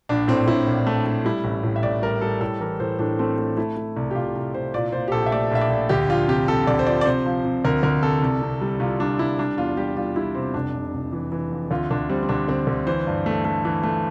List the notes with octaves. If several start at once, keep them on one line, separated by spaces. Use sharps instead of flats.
A#1 D4
A2 C4
A2 E4
A#1
A3
A3
G3 E4
A1
A2
E5
A1 D5
G3 A#4
G3 A4
A2 A4
E3 A#4
A2 C5
A2 D4
A3 C4
A3
A3 E4
A3
C2
G4
C2 F4
C2
C2 C5
A#2 D5
A#2 C5
G4
A#1 A4
E5
A3 D5
A#1 E5
D5
A#1
D2 G4
F3 F4
C3 G4
C3 A4
D2 D5
C5
F3 D5
D5
C3 C5
F3
C3
D2 A#4
D2 A#4
C3 A4
C2
C3
G3
C2 F4
G3 D4
C2 E4
G3 D4
E2 F4
G3 G4
G3 F4
G3 E4
C3 C4
F1 D4
F1
F1
E3
E3
F2
D2 F4
D2 D4
G3 C4
C4
D2 D4
D2 C4
D2
E3 C5
G2
A3
A3
E3
A3